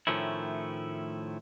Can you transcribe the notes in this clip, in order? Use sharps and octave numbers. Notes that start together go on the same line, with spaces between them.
A2 D#3 F3 A3 C#4 E4